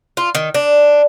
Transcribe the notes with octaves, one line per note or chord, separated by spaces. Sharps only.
F4
D#3
D4